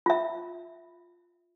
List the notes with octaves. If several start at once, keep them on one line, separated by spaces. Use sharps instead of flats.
F4 E5